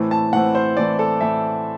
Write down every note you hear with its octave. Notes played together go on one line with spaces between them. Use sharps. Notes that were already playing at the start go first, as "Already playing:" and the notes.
Already playing: A2 E3 A3 C4
A5
A2 E3 A3 C4 F#5
C5
A2 E3 A3 C4 D5
A4
A2 E3 A3 C4 E5